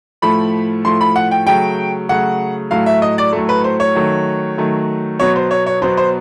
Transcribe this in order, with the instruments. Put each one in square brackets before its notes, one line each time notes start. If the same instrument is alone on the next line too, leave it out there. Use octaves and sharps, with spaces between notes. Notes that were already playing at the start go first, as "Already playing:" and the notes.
[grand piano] A2 F3 A3 B5
A2 F3 A3 C6
B5
F#5
G5
C#3 F#3 A3 G5
C#3 F#3 A3 F#5
A2 F#3 A3 F5
E5
D#5
D5
A2 F#3 A3
B4
C5
C#5
D#3 F#3 A3
D#3 F#3 A3
B2 F#3 B3 C#5
C5
C#5
C#5
B2 F#3 B3 C5
C5